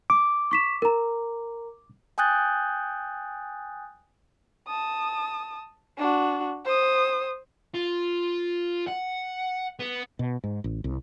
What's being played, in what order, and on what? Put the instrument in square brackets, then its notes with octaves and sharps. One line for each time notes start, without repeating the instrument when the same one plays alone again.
[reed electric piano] D6
[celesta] C#6 B6 E7
A#4 A#5
[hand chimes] G5 G#5 D#6 F#6 G6 A6
[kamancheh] A5 D#6
D4 F#4
C5 D#6
[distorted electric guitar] F4
F#5
B3
[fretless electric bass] B2
G#2
A1
C2